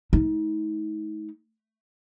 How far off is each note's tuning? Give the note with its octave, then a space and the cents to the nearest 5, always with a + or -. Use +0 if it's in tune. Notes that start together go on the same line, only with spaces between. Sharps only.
A3 -40 D#4 +40